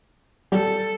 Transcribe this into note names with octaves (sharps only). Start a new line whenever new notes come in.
G3 A4